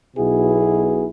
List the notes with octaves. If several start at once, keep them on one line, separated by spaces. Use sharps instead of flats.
B1 B2 B3 E4 G#4